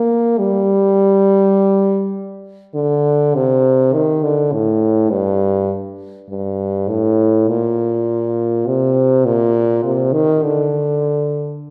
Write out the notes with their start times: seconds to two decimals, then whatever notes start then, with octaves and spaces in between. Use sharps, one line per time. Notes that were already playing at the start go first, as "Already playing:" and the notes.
Already playing: A#3
0.39 G3
2.75 D3
3.35 C3
3.93 D#3
4.23 D3
4.53 A2
5.11 G2
6.29 G2
6.89 A2
7.48 A#2
8.66 C3
9.25 A#2
9.84 C3
10.13 D#3
10.43 D3